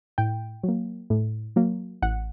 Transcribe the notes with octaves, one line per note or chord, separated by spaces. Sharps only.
A2 G5
F#3 A#3
A2
F#3 A#3
A1 F#5